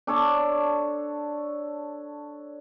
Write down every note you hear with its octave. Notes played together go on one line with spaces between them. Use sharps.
D4 A4 C#5 A5